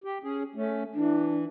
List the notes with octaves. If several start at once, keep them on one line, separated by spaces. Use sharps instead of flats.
G4
C#4 G#4
A3 C#4
E3 D4